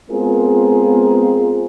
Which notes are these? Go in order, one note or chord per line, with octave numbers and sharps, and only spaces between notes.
G#3 B3 C4 F4 G#4 A#4